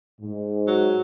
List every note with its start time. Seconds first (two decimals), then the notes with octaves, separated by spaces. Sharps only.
0.21 G#2
0.67 F#3